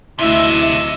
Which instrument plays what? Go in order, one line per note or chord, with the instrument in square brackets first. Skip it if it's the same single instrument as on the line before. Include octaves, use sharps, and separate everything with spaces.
[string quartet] D2 E5 [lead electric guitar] C3 F#3 [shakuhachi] E4 [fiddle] D#5 E6